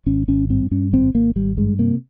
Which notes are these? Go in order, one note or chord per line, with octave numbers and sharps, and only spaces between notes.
G#1 C#4
G#1 C#4
G2 C4
G2 C#4
G#1 C4
G#1 A#3
G#1 G3
G2 G#3
C3 A#3